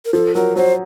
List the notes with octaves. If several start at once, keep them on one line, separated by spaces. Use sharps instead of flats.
A#4
F3 A4
F#3 A#4
F#3 C5